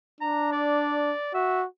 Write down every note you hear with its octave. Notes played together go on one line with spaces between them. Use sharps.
D4 A#5
D5
F#4 E5